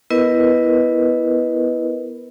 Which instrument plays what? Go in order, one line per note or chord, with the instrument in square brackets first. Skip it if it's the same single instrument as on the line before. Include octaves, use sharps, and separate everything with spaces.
[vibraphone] B3 E4 A#4 B4 D#5